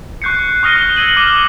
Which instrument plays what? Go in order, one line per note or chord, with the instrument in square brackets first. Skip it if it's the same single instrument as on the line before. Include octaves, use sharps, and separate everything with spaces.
[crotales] C#6 F#6 G6 C7 C#7
C#6 D#6 F6 A#6 D#7 G7
E6 G#6 D#7 F#7
D6 F6 D#7